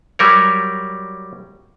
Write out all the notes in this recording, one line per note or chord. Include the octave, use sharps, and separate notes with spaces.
F#3 G3 A#4 C#5